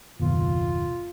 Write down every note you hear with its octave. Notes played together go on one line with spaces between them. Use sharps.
F#1 D#2 B2 F4